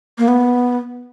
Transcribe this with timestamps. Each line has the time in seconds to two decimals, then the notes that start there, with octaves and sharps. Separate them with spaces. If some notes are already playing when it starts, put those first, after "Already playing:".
0.18 A#3
0.28 B3